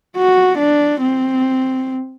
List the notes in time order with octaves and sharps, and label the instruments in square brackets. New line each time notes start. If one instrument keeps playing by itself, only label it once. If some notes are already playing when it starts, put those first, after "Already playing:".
[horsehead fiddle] F#4
D4
C4